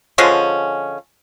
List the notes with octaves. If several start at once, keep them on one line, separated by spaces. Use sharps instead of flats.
D3 F3 G#3 C#4